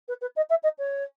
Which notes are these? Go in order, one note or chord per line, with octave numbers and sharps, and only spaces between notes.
B4
B4
D#5
E5
D#5
C#5